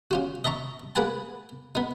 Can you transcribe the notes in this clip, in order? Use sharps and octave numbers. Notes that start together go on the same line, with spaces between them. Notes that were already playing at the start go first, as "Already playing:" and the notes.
C#4 F4 F#4
D#5 E5 A5 A#5 C#6
A#3 G#4 B4 F#5 G#5 A5
B3 D#4